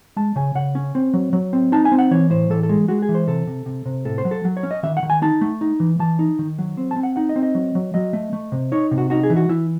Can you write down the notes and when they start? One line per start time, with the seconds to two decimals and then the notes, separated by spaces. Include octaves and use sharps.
0.16 G#3 A5
0.36 C#3 G#5
0.55 C#3 F#5
0.75 C#4
0.95 C4
1.14 F#3
1.33 F#3
1.53 C4
1.72 D#4 A5
1.85 G#5
1.92 C4
1.98 F#5
2.11 E3 C#5
2.30 A2 C5
2.50 E3 A4
2.63 A4
2.69 G#3
2.88 G#3 F#4
3.02 G#4
3.09 E3
3.15 C5
3.28 C3 A4
3.47 C3
3.66 C3
3.86 C3
4.05 A2 A4
4.18 C5
4.25 F#3
4.31 A4
4.45 F#3
4.57 C#5
4.63 C#4
4.71 D#5
4.83 D#3 E5
4.97 F#5
5.03 D#3
5.10 G#5
5.22 D#4 A5
5.41 A3
5.61 D#4
5.80 E3
5.99 E3 A5
6.19 D#4
6.39 D#3
6.59 F#3
6.77 C4
6.91 A5
6.96 C4
7.03 F#5
7.16 D#4 F#5
7.29 D#5
7.36 C4
7.43 D#5
7.55 F#3
7.75 F#3
7.94 F#3 D#5
8.13 A3
8.33 A3
8.52 C3
8.72 D#4 C#5
8.91 C3
8.98 F#4
9.10 D#4 F#4
9.23 G#4
9.30 E3
9.36 F#4
9.49 E3 E4